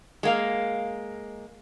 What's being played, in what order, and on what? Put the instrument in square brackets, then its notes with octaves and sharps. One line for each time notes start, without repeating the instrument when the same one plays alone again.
[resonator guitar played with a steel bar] G#3 A#3 F5